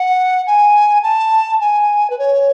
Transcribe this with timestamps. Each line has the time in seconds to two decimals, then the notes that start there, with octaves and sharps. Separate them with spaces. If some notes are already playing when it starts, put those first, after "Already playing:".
Already playing: F#5
0.47 G#5
1.03 A5
1.60 G#5
2.10 B4
2.19 C#5